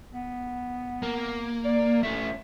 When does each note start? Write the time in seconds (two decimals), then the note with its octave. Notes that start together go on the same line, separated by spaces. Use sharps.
0.13 B3
1.03 A#3
1.64 D5
2.03 A3 C#4 E5